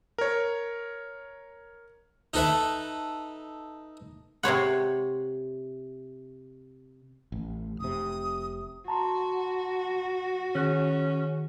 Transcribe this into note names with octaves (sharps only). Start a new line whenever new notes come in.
A#4 C#5
D#4 A4 B4 E5
C3 C5 C#5 F#5
A1
F1 C3 D#6
F#4 A5 A#5 C6
D#3 C#4 G#4 F#6